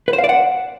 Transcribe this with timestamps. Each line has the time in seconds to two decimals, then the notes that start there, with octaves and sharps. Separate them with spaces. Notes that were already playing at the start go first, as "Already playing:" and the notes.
0.08 B4
0.13 C5
0.18 F5
0.24 D5
0.29 F#5